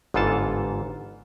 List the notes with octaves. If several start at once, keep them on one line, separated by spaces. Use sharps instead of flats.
G1 G#2 E3 F4 A4 A5